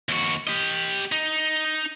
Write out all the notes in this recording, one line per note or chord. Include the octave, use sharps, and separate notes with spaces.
D#2 F#4
G4 D#5
D#4